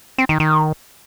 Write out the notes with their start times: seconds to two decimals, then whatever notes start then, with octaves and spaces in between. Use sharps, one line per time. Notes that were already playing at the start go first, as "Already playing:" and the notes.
0.18 C4
0.29 D#3
0.40 D#3